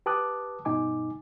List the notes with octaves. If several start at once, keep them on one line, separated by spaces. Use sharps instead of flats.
G4 B4 A5 D6 D#6 F#6
G2 B2 D#4 G#5 D6